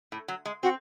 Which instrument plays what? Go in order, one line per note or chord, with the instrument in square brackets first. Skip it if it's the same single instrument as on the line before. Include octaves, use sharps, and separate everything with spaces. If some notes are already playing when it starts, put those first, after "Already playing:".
[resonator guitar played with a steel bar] A2
F#3
G#3
[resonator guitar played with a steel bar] C4 [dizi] F#4